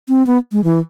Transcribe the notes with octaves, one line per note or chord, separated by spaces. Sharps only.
C4
B3
G#3
E3